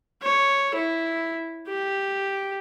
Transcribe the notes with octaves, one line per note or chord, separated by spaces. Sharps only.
C#5
E4
G4